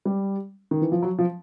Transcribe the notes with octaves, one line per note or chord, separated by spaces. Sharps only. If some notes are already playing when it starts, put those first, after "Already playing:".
G3
D#3
E3
F3
F#3
F3